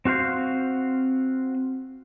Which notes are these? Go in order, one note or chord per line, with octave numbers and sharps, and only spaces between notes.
C4 F#4 F5 C6 G6